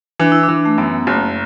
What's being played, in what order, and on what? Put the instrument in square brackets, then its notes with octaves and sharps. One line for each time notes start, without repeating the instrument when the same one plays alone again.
[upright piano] E3 [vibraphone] D4
[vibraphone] E4
D4
[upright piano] E3
[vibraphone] A3
[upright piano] F#2 [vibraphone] B3
[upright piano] F#1 [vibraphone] A3